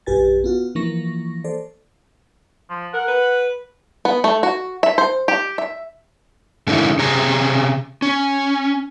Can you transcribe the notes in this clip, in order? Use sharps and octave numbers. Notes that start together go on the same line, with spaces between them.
A#1 F#2 G4 B4 G#5 A6
B3 F4 F#4
E3 F3 A#3 C#6 A#6
A4 C5 D5
F3
A#4 F#5
B4
B3
A3
F#4
E5
C5
G4
E5
G#2 D3 A#3 C#4 D#4 E4
C3 C#4 G#4 A#5
C#4